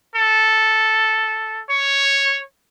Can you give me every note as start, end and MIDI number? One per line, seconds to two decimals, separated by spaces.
0.15 1.62 69
1.70 2.39 73